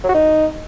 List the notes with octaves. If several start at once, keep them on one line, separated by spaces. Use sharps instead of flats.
F#3
F#4
D#4